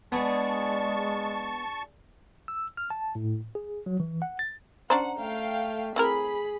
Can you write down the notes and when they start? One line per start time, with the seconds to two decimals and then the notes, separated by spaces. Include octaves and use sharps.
0.12 G#3 B3 D4 G#4 A5 C#6
2.48 E6
2.77 F6
2.90 A5
3.15 A2
3.55 G#4
3.86 F#3
4.00 E3
4.22 F#5
4.39 A6
4.90 C#4 D4 C5 F#5 A#5
5.20 A3 F5 G5
5.96 C4 E4 G#4 A#4 B5